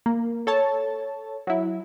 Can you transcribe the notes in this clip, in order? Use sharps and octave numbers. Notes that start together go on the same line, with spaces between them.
A#3
A4 C#5 A5
F#3 E4